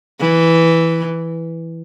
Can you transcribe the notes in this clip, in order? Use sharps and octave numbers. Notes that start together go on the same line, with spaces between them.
E3